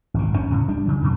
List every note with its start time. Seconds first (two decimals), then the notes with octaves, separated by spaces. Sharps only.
0.14 G#1 A#2
0.32 G1 F#2 A#2 C#4
0.50 C#2 A2 C#3
0.68 G3 D4
0.86 C#3 F#3
1.01 G2 A#2 D3 F#3